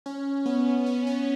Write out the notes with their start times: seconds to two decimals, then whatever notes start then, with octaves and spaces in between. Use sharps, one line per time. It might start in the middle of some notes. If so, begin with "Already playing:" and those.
0.06 C#4
0.46 B3
0.86 C#4
1.07 C#4